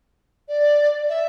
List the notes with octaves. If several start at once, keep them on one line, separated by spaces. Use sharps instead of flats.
D5
E5